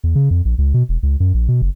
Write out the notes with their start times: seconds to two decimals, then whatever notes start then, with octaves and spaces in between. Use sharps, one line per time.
0.04 E2
0.15 C#3
0.31 F2
0.45 A#1
0.58 C#2
0.74 B2
0.89 E1
1.03 C#2
1.20 F#2
1.34 A#1
1.48 B2
1.62 F#1